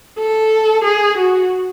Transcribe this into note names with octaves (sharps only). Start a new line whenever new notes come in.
A4
G#4
F#4